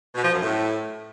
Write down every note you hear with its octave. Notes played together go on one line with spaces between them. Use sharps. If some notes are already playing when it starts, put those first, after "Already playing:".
B2
F3
F#2
A2